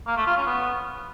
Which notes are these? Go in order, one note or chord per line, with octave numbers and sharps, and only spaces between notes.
A#3
A3
F4
C#4
B3